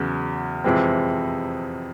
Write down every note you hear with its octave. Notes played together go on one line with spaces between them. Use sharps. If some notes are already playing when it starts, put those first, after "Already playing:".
Already playing: E2 C#3 F#3
F2 C3 E3 G#3 C4